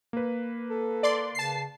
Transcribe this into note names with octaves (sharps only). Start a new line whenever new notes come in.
A#3 B4
A4
D5 C6
C#3 A5 C7